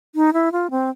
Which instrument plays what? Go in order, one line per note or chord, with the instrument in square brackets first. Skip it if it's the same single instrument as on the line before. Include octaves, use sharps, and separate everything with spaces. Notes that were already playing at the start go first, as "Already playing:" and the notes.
[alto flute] D#4
E4
F4
C4